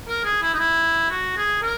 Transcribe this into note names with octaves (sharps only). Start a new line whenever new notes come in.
A#4
G#4
E4
D#4
E4
F#4
G#4
A#4